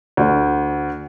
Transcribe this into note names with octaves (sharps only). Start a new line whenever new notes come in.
D2